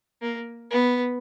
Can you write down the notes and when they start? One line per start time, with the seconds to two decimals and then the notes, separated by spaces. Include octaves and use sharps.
0.22 A#3
0.70 B3